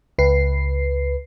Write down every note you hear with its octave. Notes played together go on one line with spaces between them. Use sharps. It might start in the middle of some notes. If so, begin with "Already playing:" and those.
C#2 B4 C7